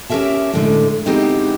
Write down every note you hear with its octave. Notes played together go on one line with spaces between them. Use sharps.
C#4 G4 G#4 A#4 E5 A5
A2 D3 G#3
G#3 B3 C4 D#4 E4 G4